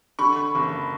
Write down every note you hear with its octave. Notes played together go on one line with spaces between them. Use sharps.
D3 B5 C#6
F#1